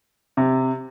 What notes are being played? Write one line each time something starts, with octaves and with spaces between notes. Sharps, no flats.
C3